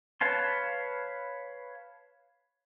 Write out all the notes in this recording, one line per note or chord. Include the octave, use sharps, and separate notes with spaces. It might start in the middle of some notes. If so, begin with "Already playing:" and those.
B4 C#5 F5 A5 C6